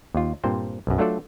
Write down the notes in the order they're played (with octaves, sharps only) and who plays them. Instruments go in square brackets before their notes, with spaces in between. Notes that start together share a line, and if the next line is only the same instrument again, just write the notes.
[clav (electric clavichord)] D#2 F4
G2 A#2 C4 C5
B1 F#2
F#3 A3 D4 F4 A4 D5